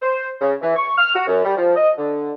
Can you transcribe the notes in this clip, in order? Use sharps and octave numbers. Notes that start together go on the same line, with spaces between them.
C5
C#3
E3
C#6
F6
F#4
F#2
G3
F3
D#5
D3